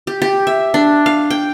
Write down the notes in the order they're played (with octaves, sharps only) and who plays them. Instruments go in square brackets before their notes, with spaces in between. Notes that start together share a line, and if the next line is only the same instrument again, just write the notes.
[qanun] G4
G4
E5
D4
F5
G5